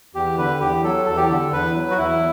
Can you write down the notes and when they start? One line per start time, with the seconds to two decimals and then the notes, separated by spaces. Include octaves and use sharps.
0.14 E2 G4
0.37 D3 B4
0.61 E2 G4
0.84 F#3 A4
1.06 E2 A4
1.17 G4
1.29 D3 A4
1.52 E2 B4
1.75 F#3
1.91 F#4
1.98 E2 E4